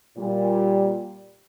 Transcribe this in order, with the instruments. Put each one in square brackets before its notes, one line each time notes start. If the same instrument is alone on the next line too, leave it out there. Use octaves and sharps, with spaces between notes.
[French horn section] A#2 G3